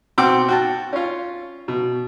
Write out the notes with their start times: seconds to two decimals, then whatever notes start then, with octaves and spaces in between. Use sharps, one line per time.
0.18 B2 C4 F#5 G5 D6 E6
0.48 F#4 G5 A5
0.93 C#4 F4
1.68 B2